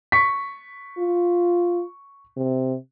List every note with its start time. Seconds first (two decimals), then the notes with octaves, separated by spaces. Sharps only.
0.12 C#6 B6
0.98 F4
2.37 C3